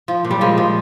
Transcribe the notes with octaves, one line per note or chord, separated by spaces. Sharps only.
F3
A#2
G3
F3 G#3
F3